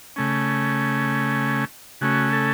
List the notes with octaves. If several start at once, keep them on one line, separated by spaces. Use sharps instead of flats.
C#3 A3 C#4
C#3 A3 C#4 F#4
A4